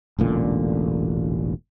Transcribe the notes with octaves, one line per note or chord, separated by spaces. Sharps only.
E1 A1 A#2 D3